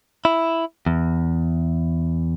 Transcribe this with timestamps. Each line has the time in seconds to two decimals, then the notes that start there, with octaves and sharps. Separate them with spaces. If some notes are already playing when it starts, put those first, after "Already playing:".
0.25 E4
0.86 E2